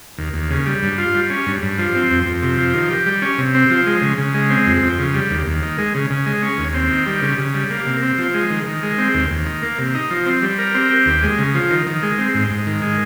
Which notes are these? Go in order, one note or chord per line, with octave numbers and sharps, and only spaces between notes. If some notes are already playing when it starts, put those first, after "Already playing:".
D#2
D#2
C#3
G3
G2
F4
G3
C#4
G2
G2
F3
C4
F2
F2
C3
F3
D#3
G4
G3
C#4
C3
C4
F3
G#3
C#3
C#3
G#3
C4
F2
F2
C#3
G3
D#2
D#2
D#3
G#3
C#3
C#3
G#3
C#4
D#2
C4
D#3
G3
C#3
C#3
G3
A#3
C3
C4
F3
G#3
D#3
D#3
G#3
C4
D#2
D#2
D#3
A#3
C3
D#4
F3
C4
G3
A#4
C4
G4
D#2
G#3
C#3
F3
D#3
D#3
G#3
C4
G#2
G#2
D#3
G#3